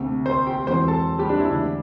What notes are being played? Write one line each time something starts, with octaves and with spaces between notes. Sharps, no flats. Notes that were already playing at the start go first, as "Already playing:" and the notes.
Already playing: D2 C3 A3 C4
C5 C6
G4 G5
E1 E2 E3 C4 C5 C6
A4 A5
G3 G4
D4
E4
E2 D3 A3 D4